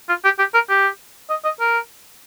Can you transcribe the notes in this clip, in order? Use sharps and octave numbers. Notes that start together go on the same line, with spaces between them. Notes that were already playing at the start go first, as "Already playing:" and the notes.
F4
G4
G4
A#4
G4
D#5
D#5
A#4